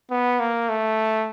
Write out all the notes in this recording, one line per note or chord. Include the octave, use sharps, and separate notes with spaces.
B3
A#3
A3